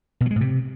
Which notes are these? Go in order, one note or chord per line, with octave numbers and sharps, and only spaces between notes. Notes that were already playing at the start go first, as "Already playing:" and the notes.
B2
F#3
G#3
A2
C3